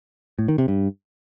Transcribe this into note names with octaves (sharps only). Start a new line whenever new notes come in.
A2
D#3
C3
G2